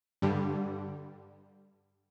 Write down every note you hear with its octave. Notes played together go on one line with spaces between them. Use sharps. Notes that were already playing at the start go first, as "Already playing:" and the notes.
G2 D3 G3